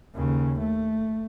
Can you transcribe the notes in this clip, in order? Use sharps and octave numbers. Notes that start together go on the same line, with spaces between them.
D#2 C#3
A3